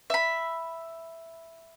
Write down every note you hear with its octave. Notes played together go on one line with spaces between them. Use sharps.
E5 B5